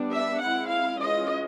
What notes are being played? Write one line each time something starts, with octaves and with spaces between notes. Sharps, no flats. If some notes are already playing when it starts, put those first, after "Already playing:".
Already playing: G3 B3 D4
E5
G#3 C4 E4 F#5
F5
E3 G#3 C#4 F4 D#5